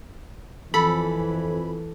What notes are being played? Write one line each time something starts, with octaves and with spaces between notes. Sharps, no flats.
F2 E3 A4 G#5 B5